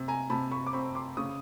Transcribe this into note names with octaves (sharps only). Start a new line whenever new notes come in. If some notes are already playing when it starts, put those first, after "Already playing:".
Already playing: C3
G#5 A#5
C3 A5 B5
B5 C#6
D6
C4 B5 C#6
C6 D6
C#3 C#6 D#6